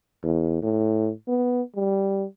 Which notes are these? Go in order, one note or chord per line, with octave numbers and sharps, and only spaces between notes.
E2
A2
B3
G3